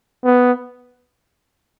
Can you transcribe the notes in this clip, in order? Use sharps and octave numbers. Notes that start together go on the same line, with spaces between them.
B3